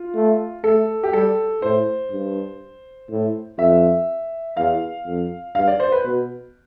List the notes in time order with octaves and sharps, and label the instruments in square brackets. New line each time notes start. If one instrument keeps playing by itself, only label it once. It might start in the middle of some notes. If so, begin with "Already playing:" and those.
Already playing: [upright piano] F4
[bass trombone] A3
[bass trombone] A3 [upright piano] A4
[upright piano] G4
[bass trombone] G3 [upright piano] A4
[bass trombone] A2 [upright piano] C5
[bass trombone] G2
A2
[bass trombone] F2 [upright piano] E5
[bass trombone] E2 [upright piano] F5
[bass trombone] F2
[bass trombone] G2 [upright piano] F5
[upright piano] D5
C5
B4
[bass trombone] B2